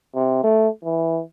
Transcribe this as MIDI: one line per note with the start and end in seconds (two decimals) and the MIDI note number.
0.15 0.41 48
0.44 0.68 57
0.84 1.21 52